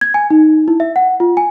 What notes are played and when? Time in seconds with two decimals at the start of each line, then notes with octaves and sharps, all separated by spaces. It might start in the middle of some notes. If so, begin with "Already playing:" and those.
0.01 G#6
0.14 G#5
0.30 D#4
0.68 E4
0.80 E5
0.96 F#5
1.20 F4
1.37 G#5